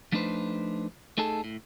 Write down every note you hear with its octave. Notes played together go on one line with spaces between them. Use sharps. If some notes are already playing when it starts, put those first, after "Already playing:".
F3 A3 D4 D#4 B4 C5
A3 D#4 G#4 A4
A2